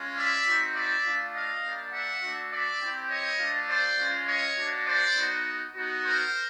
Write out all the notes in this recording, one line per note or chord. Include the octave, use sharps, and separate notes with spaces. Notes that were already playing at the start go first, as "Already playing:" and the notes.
Already playing: G#3 C#4 F4
D5 E5
C4 D#4 F#4
D5 E5
A3 D4 F4
D#5 F5
G3 A#3 D4
E5 F#5
A3 D4 F#4
D5 E5
C4 E4 G4
C#5 D#5
A3 D4 F4
C5 D5
G#3 C#4 F4
C#5 D#5
A#3 D4 F#4
C5 D5
B3 D#4 F#4
B3 D#4 F#4
A#4 C5